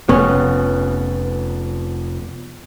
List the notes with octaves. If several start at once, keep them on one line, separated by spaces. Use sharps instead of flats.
F1 F2 B3 C#4